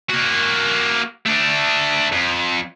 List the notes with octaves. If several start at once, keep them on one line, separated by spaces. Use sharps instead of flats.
A#3 F#4
A3 D4
F2